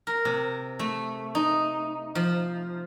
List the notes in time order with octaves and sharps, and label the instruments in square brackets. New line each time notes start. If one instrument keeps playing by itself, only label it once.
[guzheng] A#4
C3
A3
D#4
F3